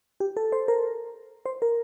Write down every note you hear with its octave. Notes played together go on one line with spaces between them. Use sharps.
G4
A4
C5
A#4
C5
A#4